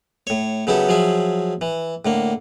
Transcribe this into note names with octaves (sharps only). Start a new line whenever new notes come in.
A2 C#5
C#3 F#3 B3 E4 G4 A4
F3 F#3 G#4 E5
E3
A2 D3 A#3